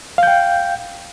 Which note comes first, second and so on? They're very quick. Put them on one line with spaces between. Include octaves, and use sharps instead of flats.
F5 G6 G5